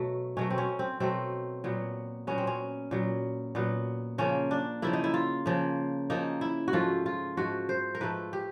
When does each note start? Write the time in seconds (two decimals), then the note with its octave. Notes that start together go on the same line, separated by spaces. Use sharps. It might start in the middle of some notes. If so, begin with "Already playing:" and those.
Already playing: B2 F#3 A3
0.37 B2 F#3 A3 C#4
0.50 C4
0.58 C#4
0.79 C4
1.00 B2 F#3 A3 C4
1.64 A#2 F#3 B3
2.27 A#2 F#3 B3 C#4
2.38 C4
2.47 C#4
2.91 A#2 F#3 B3
3.55 A#2 F#3 B3
4.18 C#3 F3 A#3 C#4
4.51 D4
4.82 C#3 F3 A#3 E4
4.93 D#4
5.04 E4
5.14 F4
5.46 C#3 F3 A#3
6.10 C#3 F3 A#3 D#4
6.41 E4
6.68 F#4
6.73 G#2 F3 A3 F4
7.06 F4
7.37 G#2 F3 A3 F#4
7.69 C5
7.95 A#4
8.01 G#2 F3 A3 B4
8.33 G4